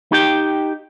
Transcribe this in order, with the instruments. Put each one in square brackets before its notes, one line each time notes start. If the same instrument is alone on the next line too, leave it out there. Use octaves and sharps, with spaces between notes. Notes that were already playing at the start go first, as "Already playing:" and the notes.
[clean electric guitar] D#4 G4 G5